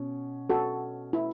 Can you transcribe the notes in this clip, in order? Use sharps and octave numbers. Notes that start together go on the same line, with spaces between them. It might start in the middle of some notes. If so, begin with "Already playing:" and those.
Already playing: B2 C#4
F#4 A4
E4